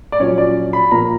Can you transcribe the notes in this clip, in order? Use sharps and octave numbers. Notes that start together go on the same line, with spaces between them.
D5
A#1 A#2 F#3 C#4 C#5
D5
B5
A#1 A#2 A#3 A#5